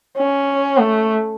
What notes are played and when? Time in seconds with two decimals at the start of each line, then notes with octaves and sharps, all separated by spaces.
0.18 C#4
0.79 A3